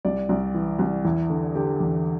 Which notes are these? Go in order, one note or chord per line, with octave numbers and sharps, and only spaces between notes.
C2 D5
C2
E3
C2
E2 E4
D3
D3 G4
E2